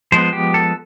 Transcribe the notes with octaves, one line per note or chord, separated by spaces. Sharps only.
F3 G#3 B3 C5
G4
A4